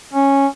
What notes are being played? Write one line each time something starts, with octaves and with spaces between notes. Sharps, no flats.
C#4